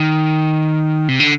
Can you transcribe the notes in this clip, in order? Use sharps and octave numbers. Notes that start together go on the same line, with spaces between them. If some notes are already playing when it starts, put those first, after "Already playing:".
Already playing: D#3
C3
D3